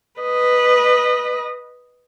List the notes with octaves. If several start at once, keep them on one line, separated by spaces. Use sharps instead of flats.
B4 D#5